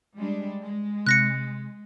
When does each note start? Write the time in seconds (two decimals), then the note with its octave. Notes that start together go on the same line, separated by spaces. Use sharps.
0.17 G3 G#3 D4
0.64 G#3
1.06 C3 F#6 A#6 C#7